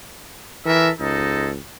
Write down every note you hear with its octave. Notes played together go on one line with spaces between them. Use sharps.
E3 A4 A#4 E5
C#2 G#3 D#4 A4